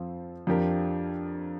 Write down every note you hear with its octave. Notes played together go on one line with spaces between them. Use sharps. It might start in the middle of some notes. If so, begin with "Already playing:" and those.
Already playing: F2 F3 C4
F2 F3 D4 G4 A#4